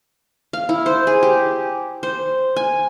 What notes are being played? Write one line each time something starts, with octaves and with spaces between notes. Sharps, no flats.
F5
E4
C5
G#4
G4
C5
G#5